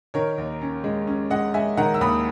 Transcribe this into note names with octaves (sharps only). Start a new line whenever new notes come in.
D#3 A#4 C#5
D#2
C#4
G#3
C#4
G#3 D#5 F#5
G#3 E5 G#5
D#3 F#5 A#5
E6
D#2 B5 D#6